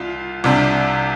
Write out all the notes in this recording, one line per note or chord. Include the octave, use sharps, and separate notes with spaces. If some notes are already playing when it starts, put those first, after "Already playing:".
Already playing: C2 F4
C2 C3 G3 D4